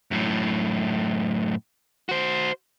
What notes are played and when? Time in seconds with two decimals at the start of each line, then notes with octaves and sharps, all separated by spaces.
0.11 F#2 A2
2.09 F#4 C5